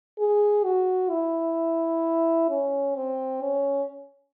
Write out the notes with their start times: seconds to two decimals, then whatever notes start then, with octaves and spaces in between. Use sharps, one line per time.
0.19 G#4
0.65 F#4
1.11 E4
2.50 C#4
2.96 C4
3.42 C#4